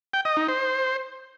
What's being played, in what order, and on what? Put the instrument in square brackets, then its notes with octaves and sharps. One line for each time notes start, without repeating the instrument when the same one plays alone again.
[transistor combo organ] G5
D#5
D#4
C5